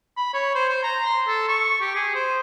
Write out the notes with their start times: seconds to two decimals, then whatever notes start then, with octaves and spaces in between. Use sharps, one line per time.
0.17 B5
0.34 C#5
0.55 C5
0.69 C5
0.83 A#5
1.06 C6
1.28 A4
1.48 C#6
1.81 G4
1.96 G#4
2.15 C5